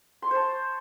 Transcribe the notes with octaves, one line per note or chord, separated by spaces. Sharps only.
C5 C#5 A5 C6